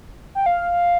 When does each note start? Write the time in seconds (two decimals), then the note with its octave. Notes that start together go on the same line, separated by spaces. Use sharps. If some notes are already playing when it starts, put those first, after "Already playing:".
0.35 G5
0.46 F5